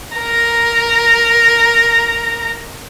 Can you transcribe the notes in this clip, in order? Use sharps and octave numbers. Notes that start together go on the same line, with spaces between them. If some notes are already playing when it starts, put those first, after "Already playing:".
A#4 A#5